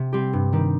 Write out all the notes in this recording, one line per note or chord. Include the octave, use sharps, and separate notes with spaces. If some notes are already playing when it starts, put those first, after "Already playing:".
Already playing: C3
G3 C4 G4
G2
D#3 G3